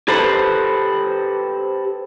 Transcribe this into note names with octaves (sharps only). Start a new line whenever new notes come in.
G4 A4 B4 C5